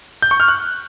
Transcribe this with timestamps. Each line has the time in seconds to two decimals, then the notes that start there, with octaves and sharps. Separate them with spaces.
0.22 G6
0.31 C#6
0.40 F6
0.48 F#6